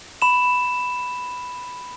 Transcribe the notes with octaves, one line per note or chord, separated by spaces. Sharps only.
B5 E7